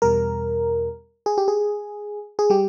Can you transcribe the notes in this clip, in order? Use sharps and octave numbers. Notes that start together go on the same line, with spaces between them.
E2 B2 G3 A#4
G#4
G4
G#4
G#4
G3 G4